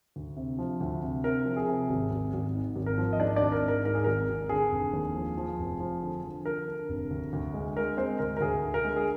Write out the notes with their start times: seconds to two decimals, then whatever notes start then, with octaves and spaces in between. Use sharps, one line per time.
0.16 D2
0.37 C3
0.59 F3
0.80 D2
1.02 C3
1.24 C3 A#4
1.45 F3
1.56 G#4
1.68 C3
1.89 G#1
2.11 G#1
2.33 G#1
2.54 G#2
2.76 G#1
2.86 A#4
2.98 F3
3.13 D#5
3.20 G#2 D4 D5
3.36 D4 D5
3.42 G#1
3.52 A#4
3.62 G#2
3.68 A#4
3.85 G#2 A#4
3.95 G#4
4.04 G#1 A#4
4.28 G#1
4.49 D3 G#4
4.72 F1
4.93 D#2
5.15 F3
5.37 F3
5.59 F1
5.80 F3
6.02 D3
6.23 F3
6.45 D3 A#4
6.68 D3
6.89 F1
7.11 D2
7.33 D2
7.54 G#3
7.76 G#3 A#4
7.97 G#3 C4 C5
8.19 D2 A#4
8.37 A#4
8.41 D2 G#4
8.62 D3
8.74 A#4
8.84 G#3
8.96 G#4